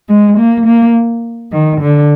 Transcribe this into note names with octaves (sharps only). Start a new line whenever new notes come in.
G#3
A#3
A#3
D#3
D3